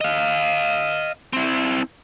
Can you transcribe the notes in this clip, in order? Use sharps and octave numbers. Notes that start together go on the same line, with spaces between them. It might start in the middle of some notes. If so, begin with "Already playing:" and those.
D#5 F5
C4 E4